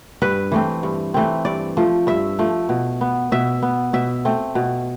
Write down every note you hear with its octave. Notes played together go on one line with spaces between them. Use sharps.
G2 B4
E3 A3 C4
G2
E3 A3 C4
G2 D5
F3 A3
G2 E5
F3 A3
B2
B3
B2 E5
B3
B2 E5
A3 C4
B2